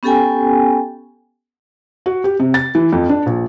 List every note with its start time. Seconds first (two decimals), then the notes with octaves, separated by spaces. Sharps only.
0.03 B3 C#4 G4 A4 G5 G#5
2.06 F#4
2.24 G4
2.40 C3
2.54 A6
2.75 E3
2.92 F2
3.09 D4
3.26 A#1